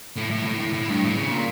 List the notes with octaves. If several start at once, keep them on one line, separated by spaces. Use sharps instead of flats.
A2
A2
A2
A2
A2
G2
A2
C#3
A#2